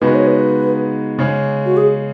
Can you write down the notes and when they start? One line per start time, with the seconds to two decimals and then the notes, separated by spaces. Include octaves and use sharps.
0.02 C#3 G#3 B3 D#4 F#4 B4
0.15 C#5
0.27 B4
1.19 C#3 G#3 C#4
1.66 F#4
1.77 G#4